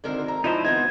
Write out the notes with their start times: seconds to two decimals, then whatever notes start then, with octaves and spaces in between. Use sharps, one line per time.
0.04 G#1 D3 A#4 C5
0.28 A#5
0.44 F3 G#3 D#4 E4 C5 D#5 A5
0.65 G#1 B3 F#4 C5 D#5 G#6